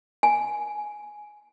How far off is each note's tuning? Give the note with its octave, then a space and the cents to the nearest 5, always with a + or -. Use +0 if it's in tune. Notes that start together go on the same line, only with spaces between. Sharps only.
G#5 +5